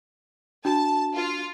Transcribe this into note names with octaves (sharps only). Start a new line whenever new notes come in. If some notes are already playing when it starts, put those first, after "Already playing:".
D4 F#4 A5
F4